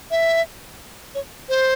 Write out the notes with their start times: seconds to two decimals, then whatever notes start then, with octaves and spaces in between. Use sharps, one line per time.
0.11 E5
1.15 C#5
1.49 C5